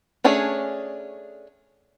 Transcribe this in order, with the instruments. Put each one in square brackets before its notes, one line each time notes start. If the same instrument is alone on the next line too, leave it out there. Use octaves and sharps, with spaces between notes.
[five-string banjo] A3 C#4 D4 G#4 C#5